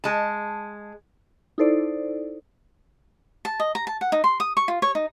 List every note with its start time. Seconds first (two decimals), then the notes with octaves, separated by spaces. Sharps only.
0.04 G#3 A5
1.58 D#4 E4 A4 C5 D5
3.45 A5
3.60 D#5
3.75 A#5
3.87 A5
4.01 F#5
4.12 D#4
4.24 C6
4.40 D#6
4.57 C#6
4.68 F4
4.82 C#5
4.95 D#4